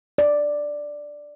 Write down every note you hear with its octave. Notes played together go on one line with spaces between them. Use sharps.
D5